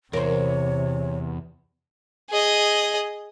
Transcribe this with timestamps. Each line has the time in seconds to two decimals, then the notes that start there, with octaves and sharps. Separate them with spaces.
0.13 E2 C3 A#4 C5 C#5
2.30 G#4 D#5